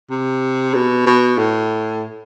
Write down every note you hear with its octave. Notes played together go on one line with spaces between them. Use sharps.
C3
B2
B2
A2